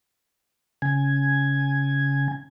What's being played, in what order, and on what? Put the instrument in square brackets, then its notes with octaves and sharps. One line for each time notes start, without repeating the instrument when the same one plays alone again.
[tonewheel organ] C#3 G#5